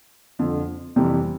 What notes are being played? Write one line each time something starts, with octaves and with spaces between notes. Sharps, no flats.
F2 D3 F3
F2 C3 E3 G3